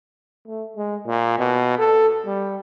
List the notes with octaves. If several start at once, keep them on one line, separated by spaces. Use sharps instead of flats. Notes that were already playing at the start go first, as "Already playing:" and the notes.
A3
G#3
A#2
B2
A4
G3